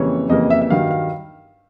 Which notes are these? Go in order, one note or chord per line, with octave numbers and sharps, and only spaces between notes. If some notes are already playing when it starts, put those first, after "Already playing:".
Already playing: F2 C#3 E3 G3 A#3 C#5
F2 C#3 E3 G3 A#3 D#5
E5
E5
G2 D#3 F#3 F5
F5